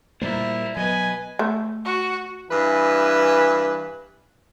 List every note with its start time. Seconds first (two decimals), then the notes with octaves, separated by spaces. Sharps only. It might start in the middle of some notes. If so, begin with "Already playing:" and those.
0.22 A#2 G3 A#3 E4 A#4 C5 D5
0.77 B2 F#3 B4 D#5 G#5
1.39 A3
1.85 F#4
2.50 G2 E3 B4 G#5